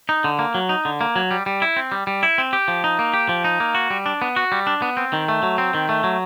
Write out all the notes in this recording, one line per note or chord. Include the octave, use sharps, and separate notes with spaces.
D#4
D3
A#3
F#3
D#4
D3
A#3
F#3
G3
G3
E4
C4
G3
G3
E4
C4
G4
F3
D#4
A#3
G4
F3
D#4
A#3
F#4
G3
D4
B3
F#4
G3
D4
B3
C4
D#3
A3
F#3
C4
D#3
A3
F#3